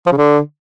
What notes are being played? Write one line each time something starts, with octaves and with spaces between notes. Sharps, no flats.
F3
C#3
D3